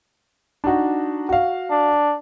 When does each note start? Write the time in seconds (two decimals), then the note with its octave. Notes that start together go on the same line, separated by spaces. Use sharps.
0.64 D4 D#4 F#4
1.29 F#4 F5
1.70 D4